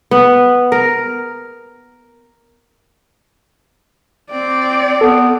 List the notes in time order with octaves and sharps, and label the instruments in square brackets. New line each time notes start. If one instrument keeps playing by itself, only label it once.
[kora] B3
A#4
[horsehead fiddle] C4 D5
[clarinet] B3 [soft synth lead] A4